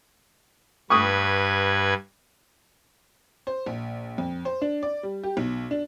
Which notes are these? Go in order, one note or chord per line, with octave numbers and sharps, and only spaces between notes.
G2 B4 C#6 D#6 G#6
C5
A#1
F2
C5
D4
D5
G3
G4
B1
D4